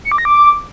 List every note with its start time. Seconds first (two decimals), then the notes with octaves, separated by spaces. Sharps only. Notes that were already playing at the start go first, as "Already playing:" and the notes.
0.05 C#7
0.12 D6
0.18 A#6
0.25 D6